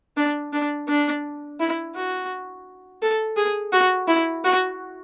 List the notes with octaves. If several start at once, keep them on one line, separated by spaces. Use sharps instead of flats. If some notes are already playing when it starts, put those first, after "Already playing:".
D4
D4
D4
E4
F#4
A4
G#4
F#4
E4
F#4